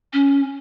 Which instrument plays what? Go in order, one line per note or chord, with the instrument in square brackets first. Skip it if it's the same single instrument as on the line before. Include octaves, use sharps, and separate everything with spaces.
[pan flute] C#4